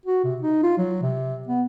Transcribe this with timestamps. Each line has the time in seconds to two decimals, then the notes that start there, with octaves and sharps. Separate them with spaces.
0.06 F#4
0.24 C3
0.42 D#4
0.63 F4
0.78 F#3
1.02 C3
1.47 B3